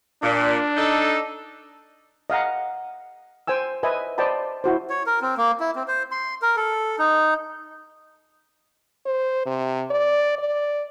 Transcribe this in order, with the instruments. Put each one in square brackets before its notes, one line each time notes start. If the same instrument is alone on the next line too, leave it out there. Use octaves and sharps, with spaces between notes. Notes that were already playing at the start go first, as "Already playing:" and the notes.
[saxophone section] A#2 [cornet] D4
[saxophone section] D#4 A4
[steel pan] D#5 F5 F#5 A#5
C5 G5 G#5 E6
B4 C5 D#5 E5 G#5
C5 D5 D#5 G5 A5 B5
E4 F#4 C5
[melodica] C#5
A#4
C4
A#3
E4
C4
C5
C6
A#4
A4
D#4
[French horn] C5
C3
D5
D5